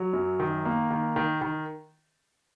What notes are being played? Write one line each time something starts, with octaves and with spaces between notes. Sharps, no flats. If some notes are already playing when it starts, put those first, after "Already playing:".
Already playing: F#3
F#2
D#3
A#3
D#3
D#3
D#3